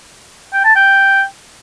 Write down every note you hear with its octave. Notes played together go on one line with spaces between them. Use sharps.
G5
A5
G5